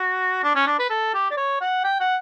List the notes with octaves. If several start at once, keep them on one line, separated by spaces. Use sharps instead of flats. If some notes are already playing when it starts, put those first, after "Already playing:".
Already playing: F#4
D4
C#4
D4
B4
A4
G4
D5
C#5
F#5
G5
F#5